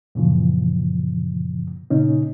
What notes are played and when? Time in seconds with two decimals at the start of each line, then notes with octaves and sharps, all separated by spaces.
0.15 F#2 A#2 C#3 E3 F3
1.90 A#2 C#3 C#4 D#4